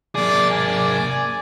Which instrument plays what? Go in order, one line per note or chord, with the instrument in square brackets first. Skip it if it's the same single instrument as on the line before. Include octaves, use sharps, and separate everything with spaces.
[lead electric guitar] A#3 G#4 [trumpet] D5
[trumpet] D5 [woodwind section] G#5